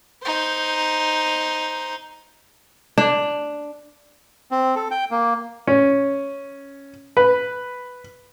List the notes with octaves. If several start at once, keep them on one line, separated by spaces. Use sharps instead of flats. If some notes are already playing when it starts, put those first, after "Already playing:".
D#4 C5
D4
C4
A4
G5
A#3
C#4
B4